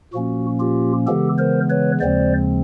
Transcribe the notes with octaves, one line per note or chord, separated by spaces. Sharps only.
A#2 F3 A#3 C#4 F#4
F4 G4
C#3 E3 G#3 B3 G4 A4
A#4 C5
B4 C#5
D#2 C#3 F3 G#3 C4 C5 D5